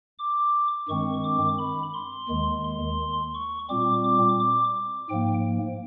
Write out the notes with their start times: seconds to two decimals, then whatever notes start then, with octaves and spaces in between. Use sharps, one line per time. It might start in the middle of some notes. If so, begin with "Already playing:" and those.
0.19 D6
0.89 G2 D#3 G#3 C4 C#6
1.24 D6
1.59 B5
1.94 C6
2.29 D#2 D#3 G#3
2.64 C6
3.34 C#6
3.69 A#2 G3 C4 D6
4.04 D6
4.39 D6
5.09 G#2 F3 A#3 G5